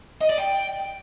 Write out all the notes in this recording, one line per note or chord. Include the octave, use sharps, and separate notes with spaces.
D#5
D5
G5